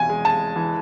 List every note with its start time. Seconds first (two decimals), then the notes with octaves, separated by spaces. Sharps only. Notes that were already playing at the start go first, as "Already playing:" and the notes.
Already playing: E2 B2 G#5
0.10 G#3
0.25 A5
0.56 E3